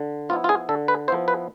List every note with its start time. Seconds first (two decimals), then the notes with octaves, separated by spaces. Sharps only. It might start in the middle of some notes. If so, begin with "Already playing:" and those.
Already playing: D3
0.29 F3 B3 E4 F4
0.44 F4
0.49 G#4
0.69 D3 A4
0.88 B4
1.08 F3 B3 E4 C5
1.28 B4